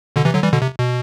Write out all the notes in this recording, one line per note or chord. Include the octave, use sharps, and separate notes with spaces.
B2 D3
C3 E3
D3 F#3
E3 G3
B2 D3
C3
B2